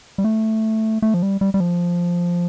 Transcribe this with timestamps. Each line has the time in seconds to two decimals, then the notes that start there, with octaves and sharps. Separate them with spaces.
0.18 G3
0.24 A3
1.02 A3
1.14 F3
1.22 G3
1.41 G3
1.54 G3
1.60 F3